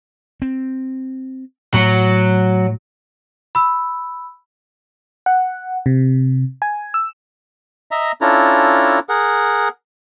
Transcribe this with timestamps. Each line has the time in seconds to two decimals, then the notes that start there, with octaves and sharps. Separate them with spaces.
0.42 C4
1.74 A2 F#3
3.55 B5 E6
5.26 F#5
5.86 C3
6.62 G#5
6.94 E6
7.91 D#5 E5 A#5
8.21 C#4 D4 E4 F4 A4 A#5
9.09 G#4 A#4 F#5